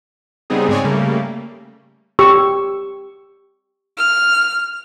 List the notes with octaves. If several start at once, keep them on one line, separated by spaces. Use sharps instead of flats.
C#3 G3 B3 C4 D#4 G#4
G#2 G#3 C4 C#5 D5 G#5
C#3 G3 A3 A#3
G4 C#6 E6
F6